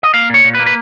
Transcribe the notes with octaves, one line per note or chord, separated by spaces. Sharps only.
D#5
A#3 F5
A#2 C#5
A#2
B4
A#3
B4